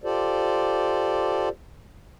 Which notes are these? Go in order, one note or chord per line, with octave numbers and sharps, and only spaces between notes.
F4 G4 A4 C5 D5